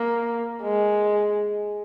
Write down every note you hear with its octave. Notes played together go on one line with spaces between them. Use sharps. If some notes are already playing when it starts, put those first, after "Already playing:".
Already playing: A#3
G#3